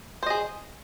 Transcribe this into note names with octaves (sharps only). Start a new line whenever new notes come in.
G#4 C5 D#5